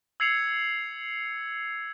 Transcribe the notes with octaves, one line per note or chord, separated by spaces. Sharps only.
E6 G#6 C7 C#7 F7